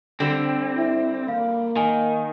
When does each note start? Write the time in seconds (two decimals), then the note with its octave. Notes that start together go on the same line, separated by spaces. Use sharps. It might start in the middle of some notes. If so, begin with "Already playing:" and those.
0.20 D3 G3 C4
0.77 E4
1.28 A#3 F5
1.76 D#3 G#5